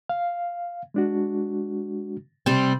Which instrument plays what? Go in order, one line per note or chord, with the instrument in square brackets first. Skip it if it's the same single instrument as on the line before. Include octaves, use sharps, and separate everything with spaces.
[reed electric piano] F5
G#3 D4 F#4
[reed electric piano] C3 [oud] G3 C4